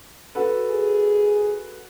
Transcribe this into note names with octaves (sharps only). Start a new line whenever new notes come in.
F#4 A4 B4
G#4